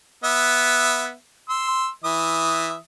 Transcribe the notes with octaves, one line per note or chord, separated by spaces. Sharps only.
B3 E5
C6 E6
E3 E5 D#6